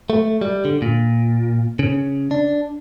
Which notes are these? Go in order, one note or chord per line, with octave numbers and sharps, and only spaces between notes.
A3
G3
D3
A#2
C#3
D4